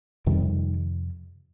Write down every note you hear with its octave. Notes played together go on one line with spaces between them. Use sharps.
F2 C3 D#3 G3